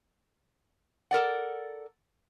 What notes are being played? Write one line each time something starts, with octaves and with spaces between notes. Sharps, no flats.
A4 A#4 D5 F#5